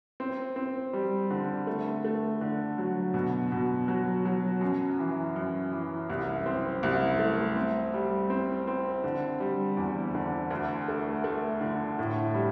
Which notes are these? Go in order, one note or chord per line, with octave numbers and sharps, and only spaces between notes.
C4
C4
G3
D3
A3
A3
D3
F#3
B2
B2
F#3
F#3
F#2
E3
F#2
E3
C2
C4
C2
A3
C4
G3
C4
C4
D3
G3
E2
D3
D2
A3
A3
D3
A2
G3